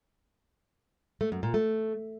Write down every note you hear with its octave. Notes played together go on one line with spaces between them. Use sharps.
A3
F#2
A#2
A3